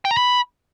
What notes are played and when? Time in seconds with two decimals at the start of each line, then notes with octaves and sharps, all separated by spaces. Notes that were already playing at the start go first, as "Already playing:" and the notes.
0.05 G5
0.11 A#5
0.17 B5